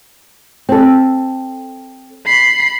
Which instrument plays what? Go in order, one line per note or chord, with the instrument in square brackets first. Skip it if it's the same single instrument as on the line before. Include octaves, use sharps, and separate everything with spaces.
[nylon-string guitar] C4 A4
[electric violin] B5 C7